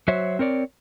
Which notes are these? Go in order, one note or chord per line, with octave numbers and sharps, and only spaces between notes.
F#3 F#4 C5 C#5 E5
C4 A#4 C#5 D5